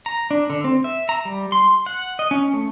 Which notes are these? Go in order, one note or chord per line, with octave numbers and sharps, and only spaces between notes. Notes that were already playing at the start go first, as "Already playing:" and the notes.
A#5
D4
D3
C4
E5
A#5
G3
C6
F#5
D#5
C#4
A3